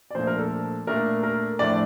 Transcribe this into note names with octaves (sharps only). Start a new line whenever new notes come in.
D5
A#2 F3 A3 D4 C5
A#4
A4
A#2 A3 D4 A#4
A#4
A2 F3 A3 D4 D5